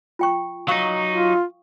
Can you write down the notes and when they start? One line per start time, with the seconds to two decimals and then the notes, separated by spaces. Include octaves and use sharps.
0.19 F4 G5 C#6
0.68 F#3 D#4 F5 C#6 D#6
1.12 F4